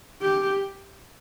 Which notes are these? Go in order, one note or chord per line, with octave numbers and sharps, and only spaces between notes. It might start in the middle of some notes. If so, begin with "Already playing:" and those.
G4